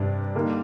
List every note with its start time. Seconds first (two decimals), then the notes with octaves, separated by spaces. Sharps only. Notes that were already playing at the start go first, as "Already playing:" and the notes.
Already playing: G2 C3 G3 D4
0.35 D3 G3 A#3 D#4